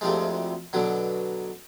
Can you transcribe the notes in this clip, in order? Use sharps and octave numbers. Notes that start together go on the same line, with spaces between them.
D2 C3 F3 G#3
B2 D3 F#3